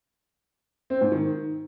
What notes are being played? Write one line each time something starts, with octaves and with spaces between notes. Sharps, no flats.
C4
G#2
D#3